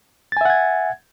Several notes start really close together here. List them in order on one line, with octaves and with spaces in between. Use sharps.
A6 G#5 E5 F#5 G#6